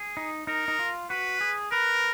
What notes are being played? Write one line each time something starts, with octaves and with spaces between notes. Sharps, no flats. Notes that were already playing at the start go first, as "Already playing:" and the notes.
Already playing: G#4
D#4
D#4 A#4
D#4
F4
F#4 B4
G#4
A#4 B4